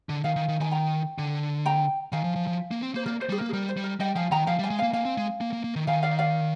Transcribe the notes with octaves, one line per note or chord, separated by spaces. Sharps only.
D3
D#3 F5 G#5
D#3
D#3
D#3 G#5
G5 A#5
D3
G5 A#5
D#3 F5 G#5
F3
F3
F3
A#3
C4
A#3 C5
A#3 A#4 D5
C5
G3 G#4
A#3 A#4
G#4
G3 A#4
C5
G3
A#4
G3 D#5 G5
F3 F5 G#5
D#3 G5 A#5
F3 F5 G#5
G3
F5 G#5
G#3
A#3 F5 G#5
A#3 F5 G#5
C4
G#3
A#3
A#3
A#3
D#3
D#3 F5 G#5
D5 F5
D5 F5